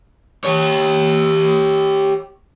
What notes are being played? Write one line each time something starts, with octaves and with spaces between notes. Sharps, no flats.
G4 C#5